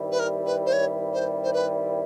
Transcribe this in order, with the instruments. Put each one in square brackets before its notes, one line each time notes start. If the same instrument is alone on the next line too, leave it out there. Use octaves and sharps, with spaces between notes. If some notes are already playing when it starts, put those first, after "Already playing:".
Already playing: [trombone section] G2 D#3 G3 C4 E4
[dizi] B4
A#4
B4
C5
C#5
C5
C5
B4